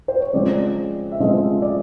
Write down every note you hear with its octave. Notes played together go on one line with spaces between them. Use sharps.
C5
C#5
C#3 F3 G#3 C4 D5
E5
C#3 F3 G#3 C4 D#5
D5